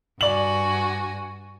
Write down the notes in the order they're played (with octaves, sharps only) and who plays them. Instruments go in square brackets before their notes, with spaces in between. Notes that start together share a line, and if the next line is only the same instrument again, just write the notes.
[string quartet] G2 F#4 G#5 [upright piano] D5 F#7